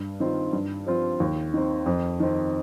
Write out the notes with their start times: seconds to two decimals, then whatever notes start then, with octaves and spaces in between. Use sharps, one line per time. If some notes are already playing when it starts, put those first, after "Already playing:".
Already playing: G2
0.20 D#3 C4 F4
0.53 G2
0.86 F3 C4 F4
1.20 D#2
1.54 D#3 C4
1.86 F2
2.20 D#3 C4